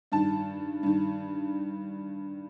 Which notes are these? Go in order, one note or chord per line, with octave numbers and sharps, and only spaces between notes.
G2 D#3 A5
G2 D#3